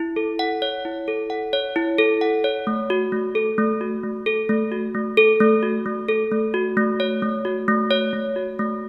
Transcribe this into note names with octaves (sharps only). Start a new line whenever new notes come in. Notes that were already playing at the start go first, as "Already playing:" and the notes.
Already playing: E4
A4
F#5
C#5
E4
A4
F#5
C#5
E4
A4
F#5
C#5
A3
F#4
A3
A4
A3
F#4
A3
A4
A3
F#4
A3
A4
A3
F#4
A3
A4
A3
F#4
A3
C#5
A3
F#4
A3
C#5
A3
F#4
A3